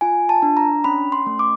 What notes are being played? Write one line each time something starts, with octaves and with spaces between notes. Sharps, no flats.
F4 G#5
A5
D4
A#5
C#4 B5
C6
A3
D6